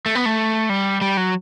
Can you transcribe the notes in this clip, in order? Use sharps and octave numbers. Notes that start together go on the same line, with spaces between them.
A3
B3
A3
G3
G3
F#3